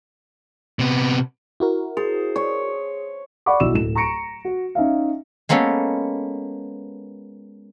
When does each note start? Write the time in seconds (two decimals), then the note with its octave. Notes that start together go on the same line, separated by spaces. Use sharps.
0.79 C3 B3
1.60 E4 F#4 A#4
1.97 G#4 C5
2.36 C#5
3.46 D5 F#5 B5 C#6 D6
3.60 B1 E4 F#4 E6 E7
3.73 D1 E7
3.95 A#5 C#6 A#6 C#7 D7
4.45 F#4
4.75 C#4 D#4 E5 F5
5.49 G#3 A#3 B3 C#4 A4